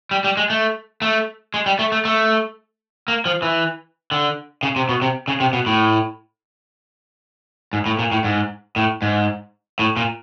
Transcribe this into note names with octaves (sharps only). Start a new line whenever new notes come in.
G3
G3
G#3
A3
A3
G#3
G3
A3
A3
A3
A#3
F3
E3
D3
C#3
C3
B2
C3
C#3
C3
B2
A2
G#2
A2
A#2
A2
G#2
A2
G#2
A2
A#2